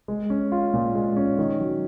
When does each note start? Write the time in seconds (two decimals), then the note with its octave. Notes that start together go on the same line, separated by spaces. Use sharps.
0.08 G#3
0.30 C#4
0.52 F4
0.73 A#2
0.95 G#3
1.17 C#4
1.38 D#3
1.60 F#3